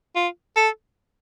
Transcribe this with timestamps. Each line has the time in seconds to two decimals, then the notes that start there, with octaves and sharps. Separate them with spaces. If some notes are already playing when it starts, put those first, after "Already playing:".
0.16 F4
0.56 A4